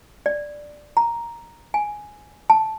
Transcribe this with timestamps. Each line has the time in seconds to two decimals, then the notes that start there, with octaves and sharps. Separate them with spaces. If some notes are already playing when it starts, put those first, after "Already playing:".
0.26 D5
0.97 A#5
1.74 G#5
2.50 A5